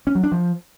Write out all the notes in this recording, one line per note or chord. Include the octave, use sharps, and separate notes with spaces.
C#4
F#3
D4
F3